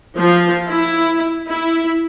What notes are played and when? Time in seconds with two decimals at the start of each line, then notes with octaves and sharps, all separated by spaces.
0.18 F3
0.69 E4
1.48 E4